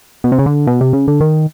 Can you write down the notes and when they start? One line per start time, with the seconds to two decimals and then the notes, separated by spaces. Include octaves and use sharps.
0.24 B2
0.32 C3
0.39 C#3
0.46 D3
0.67 B2
0.81 C3
0.93 C#3
1.08 D3
1.20 D#3